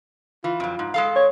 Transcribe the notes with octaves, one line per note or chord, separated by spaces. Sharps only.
E3 F4
F2 F#3
G#2
G#3 A4 F5
C#5